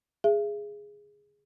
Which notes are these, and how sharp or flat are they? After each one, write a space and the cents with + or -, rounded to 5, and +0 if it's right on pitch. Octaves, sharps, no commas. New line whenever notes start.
G#4 -5 E5 +35